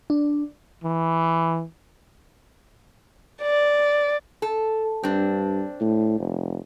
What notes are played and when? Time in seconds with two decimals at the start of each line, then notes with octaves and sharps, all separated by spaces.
0.10 D4
0.84 E3
3.42 D5
4.42 A4
5.03 G2 C4 D4
5.81 A2
6.20 F1